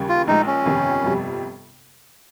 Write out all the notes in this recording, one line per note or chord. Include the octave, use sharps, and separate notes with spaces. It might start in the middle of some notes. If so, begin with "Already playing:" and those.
Already playing: D#2 C#3 G3
F4
A#1 A#2 F3 G#3 D#4
C#4
G1 F2 C3 D#3
G1 F2 C3 G3